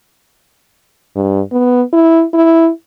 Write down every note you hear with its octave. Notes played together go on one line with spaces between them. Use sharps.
G2
B3
E4
E4